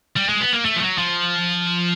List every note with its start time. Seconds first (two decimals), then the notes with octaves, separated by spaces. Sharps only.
0.16 G3
0.29 G#3
0.41 B3
0.53 A#3
0.65 A3
0.76 F3
0.82 F#3
0.98 F3